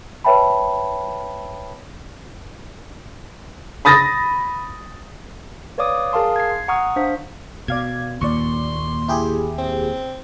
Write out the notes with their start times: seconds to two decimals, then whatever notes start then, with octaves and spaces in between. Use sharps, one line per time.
0.24 B4 C#5 E5 G5 A5 B5
3.85 B5 D#6 A6 A#6
5.78 B4 C#5 D5 F5 D6 D#6
6.12 G#4 A#4 F5 A5 C6 D#6
6.36 G#6 C7
6.68 F#5 A#5 C#6 D#6 F6
6.96 D4 C5 F5 B6
7.68 B2 D5 F5 G#6
8.21 D#2 A#2 D5 C6 C#6
9.08 E4 G4 G#4
9.58 C4